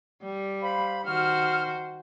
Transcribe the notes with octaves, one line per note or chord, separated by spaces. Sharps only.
G3
C5 F5 B5
D#3 F#4 C5 F6